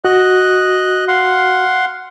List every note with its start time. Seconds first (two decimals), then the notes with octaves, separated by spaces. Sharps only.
0.05 F#4 D#5 F#6
1.08 F5 F#5 C6